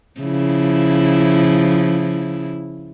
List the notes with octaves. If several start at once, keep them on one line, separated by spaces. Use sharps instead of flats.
C#3 F3 E4